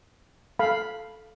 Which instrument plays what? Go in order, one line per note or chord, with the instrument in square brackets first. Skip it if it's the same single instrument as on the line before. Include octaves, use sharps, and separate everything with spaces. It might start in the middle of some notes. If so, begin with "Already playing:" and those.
[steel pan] A4 F5 B5